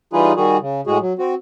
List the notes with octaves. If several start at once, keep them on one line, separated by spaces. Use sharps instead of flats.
E3 G3 D#4 F4 G#4 B4
D#3 G3 F#4 G#4
C#3
A2 G#3 F#4 G#4
F#3
C4 F#4